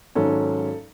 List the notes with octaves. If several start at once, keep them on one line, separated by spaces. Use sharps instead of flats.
G#1 G#2 F#3 C#4 A4